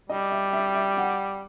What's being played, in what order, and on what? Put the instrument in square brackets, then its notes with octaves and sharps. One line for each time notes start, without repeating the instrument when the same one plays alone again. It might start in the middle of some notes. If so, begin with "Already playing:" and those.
[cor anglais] G3 [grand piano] D#5
[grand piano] E5
E5
E5
F#5